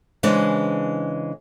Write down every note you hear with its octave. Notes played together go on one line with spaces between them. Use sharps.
C#3 E3 G#3 D4 C5 C#5